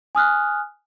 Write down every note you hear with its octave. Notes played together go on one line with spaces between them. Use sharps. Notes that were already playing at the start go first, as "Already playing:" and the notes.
G#5 D#6 F6 F#6